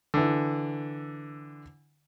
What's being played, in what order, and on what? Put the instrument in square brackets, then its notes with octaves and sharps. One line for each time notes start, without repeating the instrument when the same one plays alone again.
[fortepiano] D3 E3